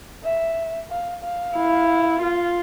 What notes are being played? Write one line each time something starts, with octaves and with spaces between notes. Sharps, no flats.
E5
F5
F5
E4
F4